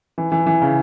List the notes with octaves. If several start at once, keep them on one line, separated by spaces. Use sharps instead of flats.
E3
E3
E3
C#3